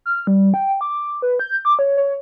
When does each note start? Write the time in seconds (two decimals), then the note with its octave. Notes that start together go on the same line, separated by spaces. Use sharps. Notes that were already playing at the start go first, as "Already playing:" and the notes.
0.06 F6
0.27 G3
0.54 G5
0.81 D6
1.22 B4
1.40 G6
1.65 D6
1.79 C#5
1.97 C#5